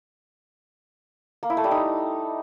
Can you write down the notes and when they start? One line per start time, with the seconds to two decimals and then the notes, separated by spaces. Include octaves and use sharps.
1.43 A#3
1.50 E4
1.57 A3
1.64 G3
1.71 D#4